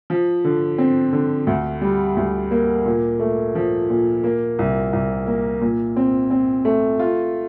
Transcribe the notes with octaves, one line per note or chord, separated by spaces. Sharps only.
F3
D3
C4
D3
D2
G3
D2
A#3
A#2
A3
F3
A#2
A#3
C2
C2
A#3
A#2
C4
C4
A3
F4